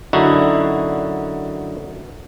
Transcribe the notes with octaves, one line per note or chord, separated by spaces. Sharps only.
F#2 D3 D#4 E4 F#4